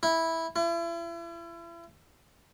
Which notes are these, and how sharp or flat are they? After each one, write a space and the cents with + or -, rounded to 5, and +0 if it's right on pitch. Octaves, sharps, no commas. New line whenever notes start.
E4 -10
E4 +40